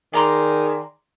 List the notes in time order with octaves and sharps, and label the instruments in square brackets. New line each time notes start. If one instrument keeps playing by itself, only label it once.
[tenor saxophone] D#3 [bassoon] G#4 [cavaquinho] D5 A#5 C6